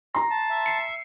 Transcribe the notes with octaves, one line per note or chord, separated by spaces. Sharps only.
A#5 C6 A#6
A5
E5
C7 C#7